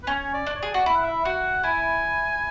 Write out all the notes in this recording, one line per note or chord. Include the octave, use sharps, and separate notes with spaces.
B4
C#4 C#5
D5
D4
C#5
G#4 D5
F#4
E4 E5
F#5
E5
F#4 F#5
E4 G#5